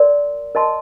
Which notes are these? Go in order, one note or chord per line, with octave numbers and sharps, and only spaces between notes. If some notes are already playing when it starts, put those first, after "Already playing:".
Already playing: A#4 D5 C6
A#4 D#5 A5 C6